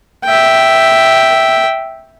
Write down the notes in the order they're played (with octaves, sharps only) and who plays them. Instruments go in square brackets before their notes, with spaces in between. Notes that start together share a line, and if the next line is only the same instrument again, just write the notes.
[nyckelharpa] E5 G5